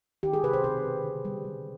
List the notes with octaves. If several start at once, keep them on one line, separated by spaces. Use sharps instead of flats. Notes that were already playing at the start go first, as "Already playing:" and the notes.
D#3 G4
G#4
C3 B4
C5
B2 B4
B2
D3
G3
G3